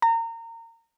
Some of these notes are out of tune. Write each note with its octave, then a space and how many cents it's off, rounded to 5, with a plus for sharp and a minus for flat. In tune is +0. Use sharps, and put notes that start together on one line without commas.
A#5 -30